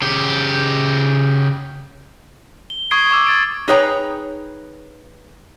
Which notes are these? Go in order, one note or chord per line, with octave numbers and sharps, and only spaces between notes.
C#3 G4
G7
C#6 D#6 G#6 C7 D7 G7
C#6 D6 E6
G#6 A6 D7
D#4 G#4 B4 C#5 G5 A#5